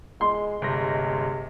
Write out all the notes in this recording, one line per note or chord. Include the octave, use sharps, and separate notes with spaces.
G#3 C6
G1 C3 G#3 A#6